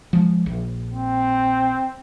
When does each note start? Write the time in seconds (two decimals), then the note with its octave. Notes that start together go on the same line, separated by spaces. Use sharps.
0.13 F3 G#3
0.46 A#1
0.94 C4